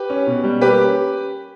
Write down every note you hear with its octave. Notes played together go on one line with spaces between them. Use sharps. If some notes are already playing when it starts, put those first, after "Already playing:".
Already playing: G4 B4
C#4
B2
G3
A#3 G4 B4
C#4